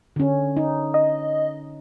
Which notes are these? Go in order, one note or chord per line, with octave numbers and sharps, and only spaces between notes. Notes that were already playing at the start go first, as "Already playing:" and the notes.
D3 C#4
D#4
D#5